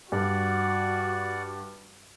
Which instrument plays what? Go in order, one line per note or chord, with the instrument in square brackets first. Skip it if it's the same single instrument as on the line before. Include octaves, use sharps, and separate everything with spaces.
[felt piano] G2 [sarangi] F#4 [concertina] D5 F#5